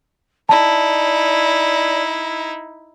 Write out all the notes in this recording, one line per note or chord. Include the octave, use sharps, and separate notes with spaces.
D#4 E4 D5 A5